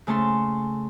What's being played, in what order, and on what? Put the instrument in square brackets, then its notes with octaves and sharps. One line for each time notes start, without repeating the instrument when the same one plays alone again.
[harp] C#3 A3 C#4 A5 C6